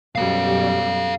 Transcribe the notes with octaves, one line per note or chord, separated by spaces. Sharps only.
F#2 B2 G3 A4 F5